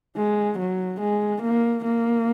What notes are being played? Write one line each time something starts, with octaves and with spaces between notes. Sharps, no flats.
G#3
F#3
G#3
A#3
A#3